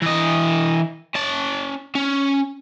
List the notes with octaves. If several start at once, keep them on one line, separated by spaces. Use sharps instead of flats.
E3 D#5
C#4 A5
C#4